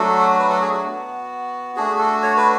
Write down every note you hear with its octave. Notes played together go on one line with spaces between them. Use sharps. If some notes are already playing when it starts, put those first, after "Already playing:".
Already playing: F#3 A3 D4 F#4 A4
B4
A4
G#4
F#4
B3 F#4
A3 D4 F#4 G#4
A4
C#5
B4